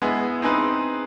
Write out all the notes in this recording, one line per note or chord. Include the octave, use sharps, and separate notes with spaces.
G#3 B3 E4 G#4
C4 D#4 G#4 B4